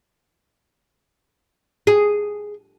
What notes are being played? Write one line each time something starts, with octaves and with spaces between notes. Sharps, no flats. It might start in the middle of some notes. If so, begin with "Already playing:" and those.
G#4